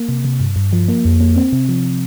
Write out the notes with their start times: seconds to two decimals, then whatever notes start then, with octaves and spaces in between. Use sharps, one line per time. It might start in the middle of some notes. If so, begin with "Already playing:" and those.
Already playing: A#3
0.09 C3
0.25 C3
0.40 G2
0.56 G2
0.73 F3
0.88 A#3
1.05 F2
1.20 A#3
1.36 C4
1.53 C3
1.69 F3